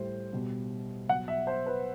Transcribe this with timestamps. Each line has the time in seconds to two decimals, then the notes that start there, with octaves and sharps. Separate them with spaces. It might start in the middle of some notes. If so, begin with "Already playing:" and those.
Already playing: A2 G3 C5
0.33 B2 G3
1.08 B2 F#3 F#5
1.28 E5
1.47 C5
1.66 B4